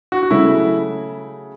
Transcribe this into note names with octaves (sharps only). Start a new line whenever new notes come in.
F#4
F#4
C#3 F#3 A3 E4